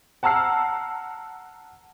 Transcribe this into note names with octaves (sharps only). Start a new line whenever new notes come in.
F#5 A5 A#5 E6 F6 C7